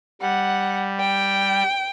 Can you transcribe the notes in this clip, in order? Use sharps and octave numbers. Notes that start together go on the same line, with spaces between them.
G3 F#5
G5